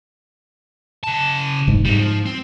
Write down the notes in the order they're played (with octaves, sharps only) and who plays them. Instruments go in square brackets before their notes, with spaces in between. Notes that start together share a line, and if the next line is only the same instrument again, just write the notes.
[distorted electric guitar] C#3 A5
[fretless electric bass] F1 G#2
[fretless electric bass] G#2 [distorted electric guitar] G3 C4
[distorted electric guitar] F3
C4